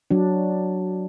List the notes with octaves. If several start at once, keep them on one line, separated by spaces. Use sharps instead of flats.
F#3 D4